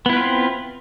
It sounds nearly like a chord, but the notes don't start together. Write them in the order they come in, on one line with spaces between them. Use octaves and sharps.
B3 E4 B4 F4 C4